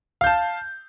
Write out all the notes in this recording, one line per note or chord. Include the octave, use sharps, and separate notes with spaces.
F5 A5 G6